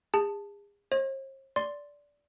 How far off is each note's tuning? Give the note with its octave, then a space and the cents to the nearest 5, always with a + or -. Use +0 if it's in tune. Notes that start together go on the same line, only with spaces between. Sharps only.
G#4 -35 A5 +0
C5 +45 D#5 +0
D5 -15 C6 +0